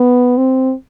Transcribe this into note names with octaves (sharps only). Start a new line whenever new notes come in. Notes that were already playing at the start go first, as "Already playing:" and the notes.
Already playing: B3
C4